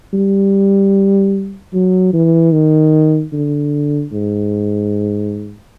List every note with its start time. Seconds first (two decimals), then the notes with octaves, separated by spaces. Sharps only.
0.13 G3
1.73 F#3
2.13 E3
2.52 D#3
3.33 D3
4.12 G#2